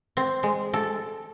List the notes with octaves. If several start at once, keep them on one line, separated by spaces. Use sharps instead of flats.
C4
G#3
A4